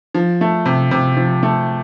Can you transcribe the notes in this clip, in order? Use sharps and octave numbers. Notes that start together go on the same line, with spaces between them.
F3
A3
C3
C3
F3
A3